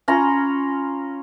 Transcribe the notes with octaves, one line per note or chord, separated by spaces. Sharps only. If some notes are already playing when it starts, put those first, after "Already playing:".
C#4 F4 A#5 B5